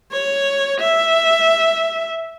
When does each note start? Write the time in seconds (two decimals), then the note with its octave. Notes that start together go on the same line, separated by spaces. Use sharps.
0.12 C#5
0.81 E5